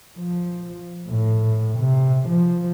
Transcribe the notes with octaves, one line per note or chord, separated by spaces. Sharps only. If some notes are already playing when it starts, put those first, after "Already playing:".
F3
A2
C3
F3